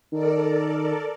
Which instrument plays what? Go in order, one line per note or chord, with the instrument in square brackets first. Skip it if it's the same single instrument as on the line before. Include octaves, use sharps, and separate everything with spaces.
[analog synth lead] D#3 [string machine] A4 A#4 D5